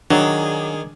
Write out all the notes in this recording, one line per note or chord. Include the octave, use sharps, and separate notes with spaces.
D#3 F#3 D4 G#4